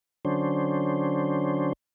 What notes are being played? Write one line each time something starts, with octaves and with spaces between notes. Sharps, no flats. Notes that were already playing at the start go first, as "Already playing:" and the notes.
D3 F#3 C#4 D4 C5